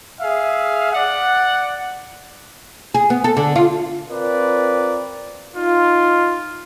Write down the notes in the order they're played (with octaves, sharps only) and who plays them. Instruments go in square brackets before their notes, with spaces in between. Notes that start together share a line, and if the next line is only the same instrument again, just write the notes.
[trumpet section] G#4 E5 F5
D5 F#5
[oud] G#4
B3
A4
D3
F4
[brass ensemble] C4 F4 A#4 B4 D5
D#4 F4